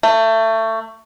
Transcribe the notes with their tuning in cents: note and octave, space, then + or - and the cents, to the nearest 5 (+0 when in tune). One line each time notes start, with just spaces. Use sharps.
A3 +25